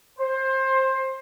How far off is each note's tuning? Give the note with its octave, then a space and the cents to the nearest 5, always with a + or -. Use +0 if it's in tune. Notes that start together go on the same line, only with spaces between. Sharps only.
C5 +20